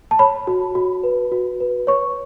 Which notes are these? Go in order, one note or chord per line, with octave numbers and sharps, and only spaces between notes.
A5
C#5 B5
F#4
F#4
B4
F#4
B4
C#5 C#6